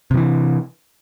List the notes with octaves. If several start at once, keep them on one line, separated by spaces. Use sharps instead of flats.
C3 E3 F3